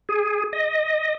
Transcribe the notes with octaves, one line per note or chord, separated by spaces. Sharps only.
G#4
D#5